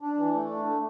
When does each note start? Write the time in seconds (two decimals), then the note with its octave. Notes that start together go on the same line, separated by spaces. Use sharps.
0.01 D4
0.18 E3
0.33 A3
0.49 D4
0.66 A3